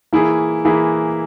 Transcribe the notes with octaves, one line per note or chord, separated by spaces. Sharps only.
E3 A#3 E4 G#4
E3 A#3 E4 G#4